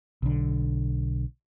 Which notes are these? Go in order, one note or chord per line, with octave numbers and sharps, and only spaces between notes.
B1 D3